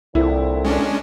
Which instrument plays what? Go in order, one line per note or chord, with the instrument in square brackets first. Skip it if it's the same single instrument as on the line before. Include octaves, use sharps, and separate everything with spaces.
[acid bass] C2 [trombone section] A#2 D3 C4 [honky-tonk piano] E4
[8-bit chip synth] G#3 C#4 D4